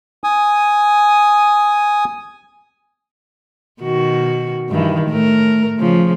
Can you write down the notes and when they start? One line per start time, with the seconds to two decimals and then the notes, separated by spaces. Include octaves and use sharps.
0.24 G#5 D#6
3.82 B2 D#3 F#4
4.69 G2 D#3 E3
5.07 A2 A3 A#4
5.78 C#3 F3